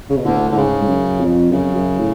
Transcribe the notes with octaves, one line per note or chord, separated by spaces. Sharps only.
C#3
B2
D2 A2 D3
A2 D3
G#2 C#3
G#2
F#2
F2
F#2 C#3
F#2
A2